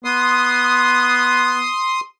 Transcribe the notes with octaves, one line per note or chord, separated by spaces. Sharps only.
B3 C6 D#6